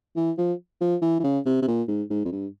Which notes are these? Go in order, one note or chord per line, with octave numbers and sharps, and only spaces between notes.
E3
F3
F3
E3
E3
C#3
C3
C3
A#2
G#2
G#2
F2
G2